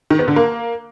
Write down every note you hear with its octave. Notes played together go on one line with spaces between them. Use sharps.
D#3
B3
D3
A#3